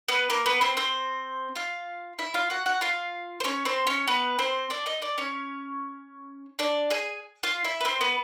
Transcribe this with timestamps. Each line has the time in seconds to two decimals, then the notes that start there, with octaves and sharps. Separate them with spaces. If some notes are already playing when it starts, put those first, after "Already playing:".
0.08 B3 B4
0.30 A#3 A#4
0.46 B3 B4
0.61 C4 C5
0.77 C4 C5
1.56 F4 F5
2.19 E4 E5
2.34 F4 F5
2.50 F#4 F#5
2.66 F#4 F#5
2.81 F4 F5
3.40 C5
3.44 C#4 C#5
3.65 C4 C5
3.87 C#4 C#5
4.07 B3 B4
4.39 C4 C5
4.70 D4 D5
4.86 D#4 D#5
5.02 D4 D5
5.18 C#4 C#5
6.59 D4 D5
6.90 G#4 G#5
7.43 F4 F5
7.64 E4 E5
7.81 B4
7.85 C4 C5
8.01 B3 B4